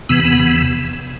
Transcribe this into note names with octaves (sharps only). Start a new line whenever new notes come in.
E2 C3 E3 B3
B3
E2 C3 E3